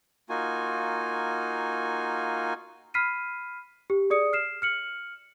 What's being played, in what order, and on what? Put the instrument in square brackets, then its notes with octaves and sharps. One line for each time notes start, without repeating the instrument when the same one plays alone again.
[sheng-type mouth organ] A#3 D#4 F4 F#4 G#5
[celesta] B5 F6 B6 C7 D#7
G4
G#4 D5 D#6 C#7
F6 C7 E7
F6 C#7 F#7